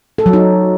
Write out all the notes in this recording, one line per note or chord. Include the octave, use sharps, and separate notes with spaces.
A4
F#3
D#4